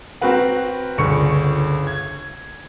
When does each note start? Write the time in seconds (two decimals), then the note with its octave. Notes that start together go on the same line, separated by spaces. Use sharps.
0.21 C4 F#4 A#4 B4 F#5
0.98 G1 C#2 D3 C#6 C#7
1.87 G#6